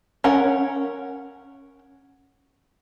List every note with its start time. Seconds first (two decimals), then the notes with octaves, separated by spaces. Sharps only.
0.24 C#4 A#4 F#5